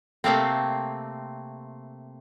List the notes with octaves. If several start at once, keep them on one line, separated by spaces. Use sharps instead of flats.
C3 A3 A#3 C4